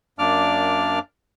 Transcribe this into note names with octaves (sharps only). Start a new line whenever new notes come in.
F#2 A#3 D4 D5 D6 F6